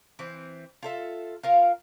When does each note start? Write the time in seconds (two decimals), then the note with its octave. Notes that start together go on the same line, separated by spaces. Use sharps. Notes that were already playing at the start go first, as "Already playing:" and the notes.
0.19 E3 C4
0.83 F4 A4 E5
1.43 F4 A#4 F5